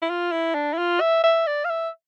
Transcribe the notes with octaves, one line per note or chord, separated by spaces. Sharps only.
E4
F4
E4
D4
E4
F4
E5
E5
D5
F5
E5